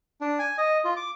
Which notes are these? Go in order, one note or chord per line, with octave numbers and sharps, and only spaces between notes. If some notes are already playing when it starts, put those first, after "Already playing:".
D4
G#5
D#5
F4
D6